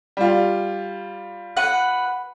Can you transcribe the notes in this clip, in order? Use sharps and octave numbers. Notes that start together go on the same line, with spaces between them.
G3 F4
B4 F#5